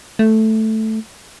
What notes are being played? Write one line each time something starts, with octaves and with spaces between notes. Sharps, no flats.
A3